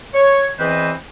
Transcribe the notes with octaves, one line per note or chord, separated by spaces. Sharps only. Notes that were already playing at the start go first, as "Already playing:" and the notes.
C#5
E2 E3 C4 B4 C5 D#5